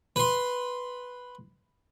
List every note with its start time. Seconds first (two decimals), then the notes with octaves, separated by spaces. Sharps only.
0.16 B4 C6